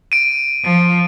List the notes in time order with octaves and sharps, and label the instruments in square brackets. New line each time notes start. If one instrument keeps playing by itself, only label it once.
[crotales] D7 D#7
[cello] F3